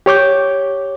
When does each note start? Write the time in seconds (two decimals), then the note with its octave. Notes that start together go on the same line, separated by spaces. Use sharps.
0.06 G4 C#5 D6 G6